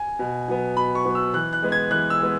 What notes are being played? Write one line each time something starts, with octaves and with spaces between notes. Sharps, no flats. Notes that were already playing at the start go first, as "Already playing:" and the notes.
Already playing: G#5
B2
F#3 B3
B2 B5
C#6
F#3 B3
E6
E3 F#6
F#6
G#3 B3
G#6
E3 F#6
E6
G#3 B3